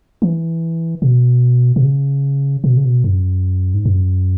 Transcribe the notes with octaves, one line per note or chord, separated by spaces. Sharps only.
E3
B2
B2
C#3
B2
C#3
B2
F#2
G#2
F#2